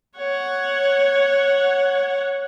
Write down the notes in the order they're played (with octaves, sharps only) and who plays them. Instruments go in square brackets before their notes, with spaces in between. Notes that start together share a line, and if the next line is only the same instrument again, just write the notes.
[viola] C#5 F#5